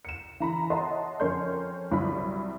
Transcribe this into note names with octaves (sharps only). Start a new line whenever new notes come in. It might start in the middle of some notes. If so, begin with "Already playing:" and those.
C#7 E7
E3 A#5 B5
C#5 D#5 E5 F#5 A5 C6
F2 C#4 A#4 C#5 C6 G6
C2 F#3 E4 B5